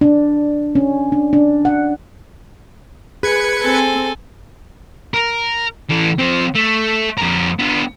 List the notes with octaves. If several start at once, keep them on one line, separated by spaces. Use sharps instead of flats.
D4
C#4
D4
D4
F#5
G#4 B4 G#6 C#7
C4 A4 G#5
A#4
E3 A4
F3 C4
A3
F2 A#4
B3 D4